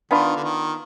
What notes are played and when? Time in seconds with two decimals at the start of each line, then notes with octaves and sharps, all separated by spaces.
0.11 D#3 B3 D4 F4
0.35 D3
0.43 D#3